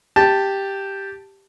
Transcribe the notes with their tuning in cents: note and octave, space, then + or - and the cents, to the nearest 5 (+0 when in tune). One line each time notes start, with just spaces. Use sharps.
G4 +0 A5 +0